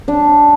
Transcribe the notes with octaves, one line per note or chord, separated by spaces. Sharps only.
D4